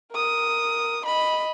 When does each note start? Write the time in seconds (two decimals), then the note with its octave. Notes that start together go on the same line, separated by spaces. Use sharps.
0.12 A#4 D#6
1.05 D#5 B5